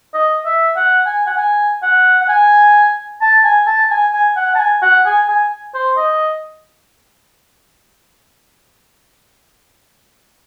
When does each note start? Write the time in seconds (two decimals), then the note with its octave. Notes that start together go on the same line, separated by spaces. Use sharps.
0.14 D#5
0.46 E5
0.76 F#5
1.06 G#5
1.27 F#5
1.37 G#5
1.83 F#5
2.21 F#5
2.29 G#5
3.22 A5
3.45 G#5
3.67 A5
3.91 G#5
4.13 G#5
4.36 F#5
4.55 A5
4.59 G#5
4.83 F#5
5.06 G#5
5.28 G#5
5.74 C5
5.97 D#5